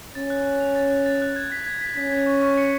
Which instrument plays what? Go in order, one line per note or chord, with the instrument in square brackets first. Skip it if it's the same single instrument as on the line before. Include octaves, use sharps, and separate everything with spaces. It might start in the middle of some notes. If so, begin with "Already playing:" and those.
[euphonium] C#4 [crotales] A6
[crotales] F#6
F#6
F7
A6
F#6
A6
F#6
G#6
B6
G#6
B6
[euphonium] C#4 [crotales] B6
[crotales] G#6
C#6
C#6
C#7